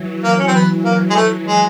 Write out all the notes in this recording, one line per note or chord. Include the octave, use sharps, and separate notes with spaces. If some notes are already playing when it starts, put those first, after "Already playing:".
Already playing: E3 F#3
A#3
C#4
C4
B3
A#3
G#3
A3
G#3